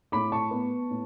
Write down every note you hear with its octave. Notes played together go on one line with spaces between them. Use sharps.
A2 B5 D6
A5 C#6
B3
A2